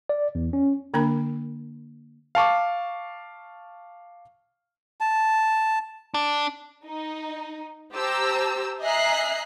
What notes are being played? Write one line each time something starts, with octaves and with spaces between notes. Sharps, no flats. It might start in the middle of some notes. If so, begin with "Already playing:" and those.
D5
E2
C#4
D3 A#3 D4 A#4 B5
F5 A5 C#6 D6
A5
D4
D#4
G4 C5 A5 A#5 E6
D#5 E5 G#5 A#5 F#6 C7